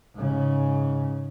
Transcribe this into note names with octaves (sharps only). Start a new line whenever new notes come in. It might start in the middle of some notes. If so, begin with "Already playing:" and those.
G#2 C#3